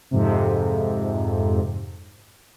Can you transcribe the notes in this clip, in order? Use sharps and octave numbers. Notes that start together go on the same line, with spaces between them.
F2 G#2 C3